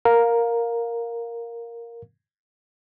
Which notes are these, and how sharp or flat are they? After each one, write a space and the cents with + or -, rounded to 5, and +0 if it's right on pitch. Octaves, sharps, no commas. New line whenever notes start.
A#4 +0 F5 +15